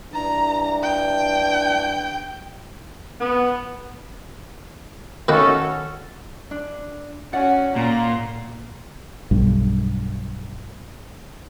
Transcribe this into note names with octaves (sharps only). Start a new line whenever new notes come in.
G2 E3 D4 A#5
G5
B3
D#3 A3 A#3 C#4 F#4 A4
D4
C#4 F#4 D5 F#5
A#2 A#5
B1 G2